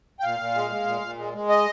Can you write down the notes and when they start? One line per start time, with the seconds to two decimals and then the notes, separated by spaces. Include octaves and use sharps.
0.20 G5
0.23 A#2 F5
0.40 A#2
0.55 G#3
0.71 G#3
0.86 A#2
1.01 A#2
1.18 G#3
1.34 G#3
1.49 D#5